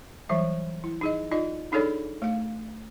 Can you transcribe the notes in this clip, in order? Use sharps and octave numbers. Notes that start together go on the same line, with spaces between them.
E3 F#3 G3 E5
E4
D#4 G#4 D#5
D#4 F4 D5 D#5
D4 D#4 G#4 A4 C#5 D5
A3 F5